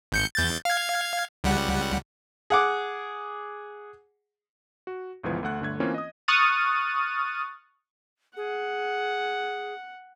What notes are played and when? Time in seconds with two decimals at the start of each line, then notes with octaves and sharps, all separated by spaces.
0.12 G#1 G6 C#7
0.35 E2 G6 A6
0.65 F5 G#6
1.44 C#2 G3 F#5
2.50 G#4 F#5 D6
4.87 F#4
5.23 G1 C#2 E3 F3 B3 G#6
5.43 D2 A3 F#5 F#6
5.60 G1 D3 A3 G#6
5.80 E3 A#3 C4 C#4 F4 C#5
5.94 D#5 D#6
6.28 C#6 D#6 F6 F#6 A6 D#7
8.37 G#4 F#5